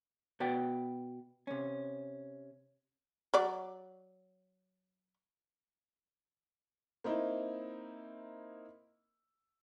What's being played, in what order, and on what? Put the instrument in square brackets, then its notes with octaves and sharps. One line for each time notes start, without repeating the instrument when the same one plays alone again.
[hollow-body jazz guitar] B2 F#4 B4 D5 G5
C3 C#4
[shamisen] F#3 D5
[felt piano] A#3 C4 D#4 E4